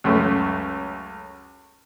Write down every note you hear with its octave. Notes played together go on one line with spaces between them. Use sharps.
C#2 F#2 A3